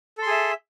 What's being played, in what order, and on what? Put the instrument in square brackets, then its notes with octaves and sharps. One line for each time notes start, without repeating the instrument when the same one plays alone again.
[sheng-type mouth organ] A4
C6
G#4
E5